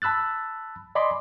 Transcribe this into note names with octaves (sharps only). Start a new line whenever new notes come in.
A5 B5 E6 F#6 A6
D5 D#5 G#5 B5 C6 D6